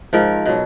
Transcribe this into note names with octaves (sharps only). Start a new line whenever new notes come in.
G#2 F3 A#4
B2 F#3